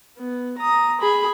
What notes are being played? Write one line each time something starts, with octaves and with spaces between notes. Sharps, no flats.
B3
A#5 D#6
G#4 B5